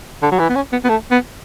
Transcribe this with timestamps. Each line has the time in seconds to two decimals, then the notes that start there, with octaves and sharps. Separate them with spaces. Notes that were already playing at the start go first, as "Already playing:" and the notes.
0.23 D3
0.32 F#3
0.39 E3
0.50 B3
0.56 C#4
0.72 B3
0.85 B3
0.89 A3
1.11 B3